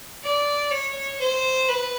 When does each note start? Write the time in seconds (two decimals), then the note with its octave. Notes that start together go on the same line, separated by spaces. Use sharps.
0.23 D5
0.71 C#5
1.20 C5
1.69 B4